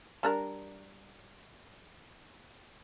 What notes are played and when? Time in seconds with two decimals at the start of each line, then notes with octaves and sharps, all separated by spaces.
0.23 G3 D4 A#4